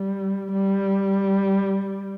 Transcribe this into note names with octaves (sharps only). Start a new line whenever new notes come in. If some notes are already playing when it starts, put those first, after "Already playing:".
Already playing: G3
G3